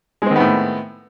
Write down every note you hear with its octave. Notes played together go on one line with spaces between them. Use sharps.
A2 D#3 G#3 B3 C4